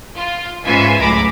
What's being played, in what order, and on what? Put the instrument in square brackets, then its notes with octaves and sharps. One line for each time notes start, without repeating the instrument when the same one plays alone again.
[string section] F4
G#2 C#4 F4 B4 E5 G#5
C#2 F#2 A2 A#5 B5 D6